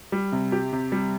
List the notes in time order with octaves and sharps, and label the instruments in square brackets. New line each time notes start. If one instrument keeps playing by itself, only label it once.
[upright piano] G3
C3
G4
C3
G3